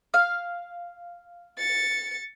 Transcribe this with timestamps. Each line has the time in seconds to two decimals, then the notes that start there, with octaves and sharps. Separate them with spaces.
0.14 F5
1.58 A6 C#7